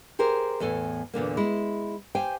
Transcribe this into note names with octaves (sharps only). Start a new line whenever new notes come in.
G4 G#4 A#4 C5
E2 A2 A4 G#5
E2 A#2 D3 A#3
G#3 E4
G4 C5 F5 G5 G#5